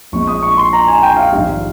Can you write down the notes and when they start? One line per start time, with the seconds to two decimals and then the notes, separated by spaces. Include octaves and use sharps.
0.12 A#1 A#2 G#3 C#6
0.27 D#6
0.42 C#6
0.57 C6
0.73 A#5
0.88 G#5
1.02 G5
1.17 F5
1.32 A#1 G#2 D#3 G3 F5